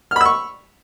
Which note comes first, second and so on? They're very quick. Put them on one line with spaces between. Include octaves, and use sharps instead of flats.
F6 B5 E6 C#6